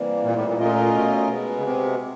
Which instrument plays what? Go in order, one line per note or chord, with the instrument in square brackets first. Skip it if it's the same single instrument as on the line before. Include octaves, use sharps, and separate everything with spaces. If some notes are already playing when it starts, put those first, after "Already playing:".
Already playing: [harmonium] C3 E3 G3 A#3
[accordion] A#2
A2
A#2
[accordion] A#2 [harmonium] A3 C#4 F4 A#4 D#5
[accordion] B2
[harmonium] B2 G#3 B3
[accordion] C#3
C3